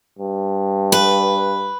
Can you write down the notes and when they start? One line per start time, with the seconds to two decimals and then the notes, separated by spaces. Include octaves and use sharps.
0.19 G2
0.92 B4